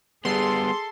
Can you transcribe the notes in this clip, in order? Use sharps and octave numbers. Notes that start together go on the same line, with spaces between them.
G3 B3 G#4 A4 C6